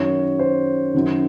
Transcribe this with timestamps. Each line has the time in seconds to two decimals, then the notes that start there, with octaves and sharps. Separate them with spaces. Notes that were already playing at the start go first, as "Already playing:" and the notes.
Already playing: F#2 D#3 C#5
0.39 C5
0.94 F#2 D#3